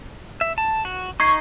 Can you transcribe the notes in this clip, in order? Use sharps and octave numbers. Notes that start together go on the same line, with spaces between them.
E5
A5
F#4
D#4 C#6 G#6 C7